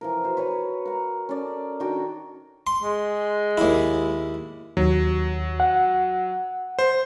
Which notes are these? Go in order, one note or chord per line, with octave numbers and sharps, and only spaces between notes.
E3 F3 A#4
F#4 C5
B4 C#5 G#5 A#5
A#4 F#5 A#5
C#4 A4 A#4 D5
D#3 D4 F#4 G5
C6
G#3
D#2 E4
D#2 F#3
F#5
C5